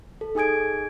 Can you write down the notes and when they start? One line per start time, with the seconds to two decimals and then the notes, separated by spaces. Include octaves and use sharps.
0.21 A4
0.35 D#4 G#4 G#5 D#6 G#6 D7